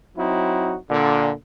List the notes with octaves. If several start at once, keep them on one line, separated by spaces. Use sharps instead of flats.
F#3 C4 D#4 E4 F#4
A#2 D3